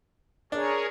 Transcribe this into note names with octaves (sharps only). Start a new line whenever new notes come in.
D4 G#4 A#4 C#5